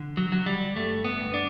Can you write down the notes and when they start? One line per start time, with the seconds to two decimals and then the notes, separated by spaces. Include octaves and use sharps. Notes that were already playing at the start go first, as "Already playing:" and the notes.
Already playing: D3
0.17 F#3
0.32 D3 F#3
0.46 G3
0.76 G2 A3
1.04 B3
1.20 G2
1.34 D4